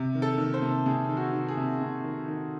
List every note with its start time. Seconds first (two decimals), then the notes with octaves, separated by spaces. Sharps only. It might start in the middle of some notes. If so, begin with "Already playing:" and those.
Already playing: C3
0.15 D#3
0.22 A4
0.38 D#3
0.54 C5
0.62 C3
0.86 C3 G#4
1.09 D#3
1.17 F#4
1.33 D#3
1.48 G#4
1.57 C3
1.81 C3
2.04 D#3
2.28 D#3